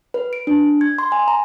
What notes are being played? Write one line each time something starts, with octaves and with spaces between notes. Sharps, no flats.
B4
D7
D4
G#6
C6
G#5
A#5